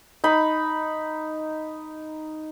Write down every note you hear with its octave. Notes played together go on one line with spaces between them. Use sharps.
D#4 B5